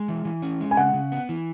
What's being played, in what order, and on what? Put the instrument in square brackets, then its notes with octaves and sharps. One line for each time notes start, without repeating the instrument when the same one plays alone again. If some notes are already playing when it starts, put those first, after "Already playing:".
Already playing: [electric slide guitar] G#3
E3
E3
C#4
G#3
[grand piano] G#5
[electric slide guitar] C#3 [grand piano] F#5
[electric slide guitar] C#3
B3
E3